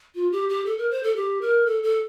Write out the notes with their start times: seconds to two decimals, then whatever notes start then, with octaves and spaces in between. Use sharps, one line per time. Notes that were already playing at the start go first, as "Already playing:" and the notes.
0.15 F4
0.32 G4
0.49 G4
0.66 A4
0.78 A#4
0.91 C5
1.03 A4
1.16 G4
1.41 A#4
1.67 A4
1.83 A4